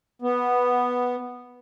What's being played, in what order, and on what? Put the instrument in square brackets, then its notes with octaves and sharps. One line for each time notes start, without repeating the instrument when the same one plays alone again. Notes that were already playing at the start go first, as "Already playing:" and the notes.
[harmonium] B3